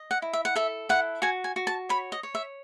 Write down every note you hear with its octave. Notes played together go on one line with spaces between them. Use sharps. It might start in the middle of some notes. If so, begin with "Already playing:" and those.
Already playing: D#5
F#5
E4
E5
F#5
A4 E5
E4 F#5
F#4 G#5
G#5
F#4
A5
C#5 B5
D#5
C#5
E5